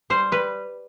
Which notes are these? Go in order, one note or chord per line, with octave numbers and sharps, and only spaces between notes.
G3 C5
G3 B4